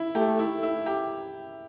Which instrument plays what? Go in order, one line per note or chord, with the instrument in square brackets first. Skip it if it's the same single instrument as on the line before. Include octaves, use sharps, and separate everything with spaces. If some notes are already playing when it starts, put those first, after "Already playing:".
Already playing: [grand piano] E4
[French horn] A3 [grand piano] G4
[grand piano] E4
E4
G4